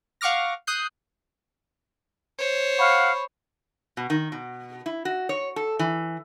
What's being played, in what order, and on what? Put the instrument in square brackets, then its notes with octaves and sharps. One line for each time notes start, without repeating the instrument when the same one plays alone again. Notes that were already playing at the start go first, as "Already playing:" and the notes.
[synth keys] F5 F#5 C#6 D6 F6 A#6
D#6 F#6 G6 C7
[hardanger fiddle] C5 C#5
[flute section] F5 F#5 [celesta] B5 C#6
[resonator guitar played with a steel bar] B2
D#3
B2
E4
F#4
C#5
A4
E3